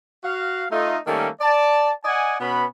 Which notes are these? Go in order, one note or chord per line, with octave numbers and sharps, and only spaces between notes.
F#4 F5
A3 D#4 F4
D#3 G3 A3 A#3 C#4 A4
D5 A5
D5 D#5 F#5 G#5
B2 B3 C#4 B4 B5